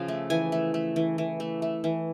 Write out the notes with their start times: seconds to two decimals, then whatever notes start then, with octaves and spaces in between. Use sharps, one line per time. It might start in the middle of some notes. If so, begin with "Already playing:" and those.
Already playing: C#3 F3 F5
0.08 A3
0.30 E3 G#5
0.52 A3
0.74 A3
0.96 E3
1.18 E3
1.40 A3
1.62 A3
1.84 E3